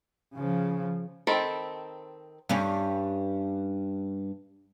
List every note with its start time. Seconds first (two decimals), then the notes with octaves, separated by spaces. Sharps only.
0.35 C#3 F3
1.27 D#3 C4 A4 B5
2.49 G2 G3 C#4